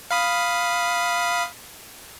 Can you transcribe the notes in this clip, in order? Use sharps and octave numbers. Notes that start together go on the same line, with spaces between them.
F5 B5 D#6